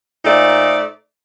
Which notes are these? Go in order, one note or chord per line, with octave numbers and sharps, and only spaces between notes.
A#2 A3 D#4 C5 D5